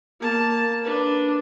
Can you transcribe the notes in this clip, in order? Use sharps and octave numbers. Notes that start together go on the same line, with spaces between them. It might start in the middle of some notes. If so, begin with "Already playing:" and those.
A#3 A5
D4 B4